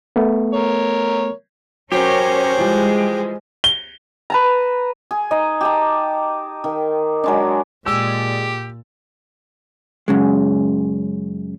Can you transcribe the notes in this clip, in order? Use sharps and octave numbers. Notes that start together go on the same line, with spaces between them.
A3 B3
A#4 C#5
F#3 C#4 G4 G#4 A#4 C5 C#5
E3 F3 G3 G#3
G7
B4 A5 A#5
G#4
D#4 D#5
G4 A5 A#5
D#3
F#3 G#3 D4
A#2 G#3 G4 G#4 D5 E6
F#2 C#3 G#3